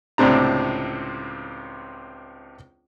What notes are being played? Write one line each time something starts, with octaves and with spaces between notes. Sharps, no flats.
C#2 A2 C3 C4 D4 A#5